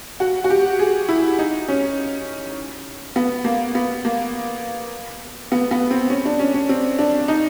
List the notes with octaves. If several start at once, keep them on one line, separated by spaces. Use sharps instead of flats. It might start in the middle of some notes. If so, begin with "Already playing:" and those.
F#4
F#4
G4
G#4
E4
D#4
C#4
B3
A#3
B3
A#3
B3
B3
C4
C#4
D4
C#4
C#4
C4
D4
D#4